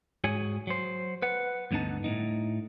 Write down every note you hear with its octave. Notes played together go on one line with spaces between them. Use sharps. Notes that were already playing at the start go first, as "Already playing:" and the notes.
G#2 F#4 G#4 C#5 G#5
F#3 C5
B4 F#5
D2 G2 D3 B3 D#4 A5
A2 A#3 D#4